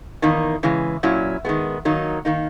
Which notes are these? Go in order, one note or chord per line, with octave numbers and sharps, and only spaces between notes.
E2 D#3 A#3 D#4
C#3 E3 G#3
A#2 F#3 C#4 E4
D#3 G#3 B3
D#3 F#3 A#3 D#4
D#3 A#3 D#4